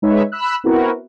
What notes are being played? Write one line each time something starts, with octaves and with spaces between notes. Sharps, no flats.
G#3 D#4 B4 C#5 E5
B5 E6 F#6
B3 C4 E4 F#4 A#4 B4